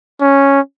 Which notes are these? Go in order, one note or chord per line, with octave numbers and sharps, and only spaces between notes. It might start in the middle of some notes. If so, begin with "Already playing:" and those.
C#4